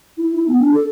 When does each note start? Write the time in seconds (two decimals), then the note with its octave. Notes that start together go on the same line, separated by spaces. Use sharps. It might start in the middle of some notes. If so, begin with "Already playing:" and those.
0.18 E4
0.35 E4
0.48 B3
0.60 D4
0.73 A4